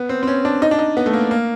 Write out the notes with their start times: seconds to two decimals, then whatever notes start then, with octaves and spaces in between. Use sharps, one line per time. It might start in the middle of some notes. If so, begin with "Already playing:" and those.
Already playing: B3
0.09 C4
0.23 C4
0.27 C#4
0.45 D4
0.62 D#4
0.71 D4
0.79 D#4
0.97 B3
1.06 A3
1.13 A#3
1.31 A#3